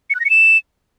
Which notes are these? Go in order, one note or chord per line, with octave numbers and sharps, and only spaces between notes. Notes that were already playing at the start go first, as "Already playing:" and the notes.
C#7
F#6
A#6
C#7
E7